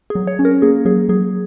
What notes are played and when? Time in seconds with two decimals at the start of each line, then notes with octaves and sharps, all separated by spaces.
0.10 G#4
0.15 F#3
0.27 C#5
0.39 C#4
0.45 A#4
0.62 A#3 G#4
0.85 F#3 G#4
1.09 F#3 G#4